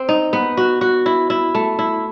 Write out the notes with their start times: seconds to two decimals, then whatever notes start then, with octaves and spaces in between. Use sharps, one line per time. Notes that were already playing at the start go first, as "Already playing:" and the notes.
Already playing: C4
0.09 D#4
0.33 B3
0.57 F#4
0.81 F#4
1.06 E4
1.30 E4
1.55 A3
1.79 E4